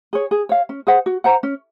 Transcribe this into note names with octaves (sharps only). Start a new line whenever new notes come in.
G#4 C#5
G#4
C#5 F5
C#4
G#4 C5 F#5
F#4
C5 F#5 A#5
C#4